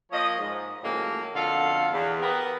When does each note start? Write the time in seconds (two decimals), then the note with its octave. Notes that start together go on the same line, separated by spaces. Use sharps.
0.12 F3 A#3 C#5 D#5
0.39 G#2
0.83 A2 C#3 F3 F#3 G#3 A#3
1.35 F2 B2 D3 F4 A4 F5
1.92 E2
2.21 B3 G4 G#4 A#4 B4